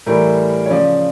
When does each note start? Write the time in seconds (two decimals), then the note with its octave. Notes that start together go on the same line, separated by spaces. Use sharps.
0.06 A2 E3 G3 A#4
0.66 C#5
0.70 C#3 F3 D5